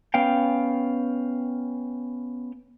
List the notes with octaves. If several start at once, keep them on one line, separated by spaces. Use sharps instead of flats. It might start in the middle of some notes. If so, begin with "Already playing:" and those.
B3 C#4 F5 G5